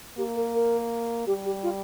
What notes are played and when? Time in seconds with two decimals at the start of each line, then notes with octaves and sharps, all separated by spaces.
0.18 A#3 G4
0.36 A#4
0.55 A#4
1.27 G3 G4
1.45 G4
1.63 F4